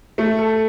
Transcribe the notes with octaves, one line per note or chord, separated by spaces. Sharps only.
A3
A4